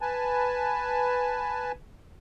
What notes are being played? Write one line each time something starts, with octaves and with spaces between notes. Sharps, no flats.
B4 G#5 A5